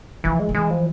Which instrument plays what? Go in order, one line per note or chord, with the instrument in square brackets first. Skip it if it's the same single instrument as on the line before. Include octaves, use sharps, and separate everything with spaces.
[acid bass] E3 [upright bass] F3
[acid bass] G#3
[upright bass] F3
[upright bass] E3 [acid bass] G#3
[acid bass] F3